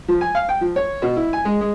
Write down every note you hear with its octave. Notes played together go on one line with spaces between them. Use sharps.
F3
G#5
F5
G5
F3
C#5
B2
E4
G#5
G#3
G#3